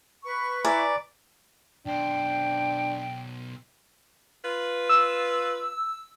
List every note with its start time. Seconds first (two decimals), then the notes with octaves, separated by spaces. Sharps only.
0.25 B4 C#6
0.65 E4 D5 G#5 A#5
1.86 B1 D4 C5 G5
4.45 F4 B4
4.89 E6